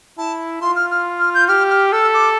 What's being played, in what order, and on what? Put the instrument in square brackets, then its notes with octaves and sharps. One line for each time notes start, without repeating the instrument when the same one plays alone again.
[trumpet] E4 [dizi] A5
[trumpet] F4 [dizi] C6
[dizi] F6
F6
F6
G6
[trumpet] G4 [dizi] F6
[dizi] F6
[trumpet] A4 [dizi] E6
[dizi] D6